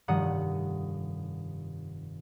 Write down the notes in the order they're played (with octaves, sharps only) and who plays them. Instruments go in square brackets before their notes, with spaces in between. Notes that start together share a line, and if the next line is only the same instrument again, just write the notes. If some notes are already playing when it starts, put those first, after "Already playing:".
[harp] F1 G2 D#3 F#5 D#6